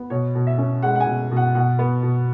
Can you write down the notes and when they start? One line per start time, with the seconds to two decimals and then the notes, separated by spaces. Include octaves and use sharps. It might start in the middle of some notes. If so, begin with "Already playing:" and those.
Already playing: B3
0.10 B2 C#5
0.35 B2
0.47 E5
0.58 C#4
0.82 G#3 F#5
0.95 F#5
1.00 G#5
1.06 B2
1.31 B2
1.37 F#5
1.55 B2 F#5
1.79 B3
2.03 B2